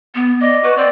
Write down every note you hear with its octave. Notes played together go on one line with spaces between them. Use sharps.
B3
D5 D#5
F#4 B4
C4 D5